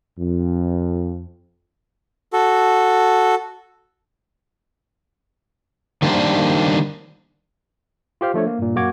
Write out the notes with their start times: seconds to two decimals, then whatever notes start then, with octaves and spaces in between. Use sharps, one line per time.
0.18 F2
2.33 F#4 A4
6.02 D#3 G3 A#3 D4 G4 C5
8.21 F4 G4 C5 F5
8.34 F3 A3 D4 C#5
8.47 A#3
8.59 G2 A#2
8.76 F#2 A#3 C#4 F#4 D6 G#6